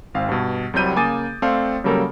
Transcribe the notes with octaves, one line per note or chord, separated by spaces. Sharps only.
G#1 C4 F5
G2 B2
C2 C3 F#3 G3 G6 D#7
C#3 A#3 G#5 D6 D#6 A6
A3 C4 A4 C5 D5 F5
C#3 F#3 G3 A#3 A4 A#4